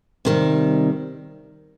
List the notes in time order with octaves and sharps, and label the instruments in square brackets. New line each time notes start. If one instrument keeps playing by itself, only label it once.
[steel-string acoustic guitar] C3 D#3 G3